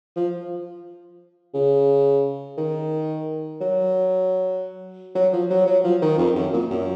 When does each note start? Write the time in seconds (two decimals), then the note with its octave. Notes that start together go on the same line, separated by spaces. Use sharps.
0.16 F3
1.54 C#3
2.58 D#3
3.61 F#3
5.15 F#3
5.33 F3
5.50 F#3
5.67 F#3
5.84 F3
6.02 D#3
6.18 F2
6.36 F#2
6.53 A#2
6.70 F#2